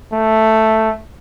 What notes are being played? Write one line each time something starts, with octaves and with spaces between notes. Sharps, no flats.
A3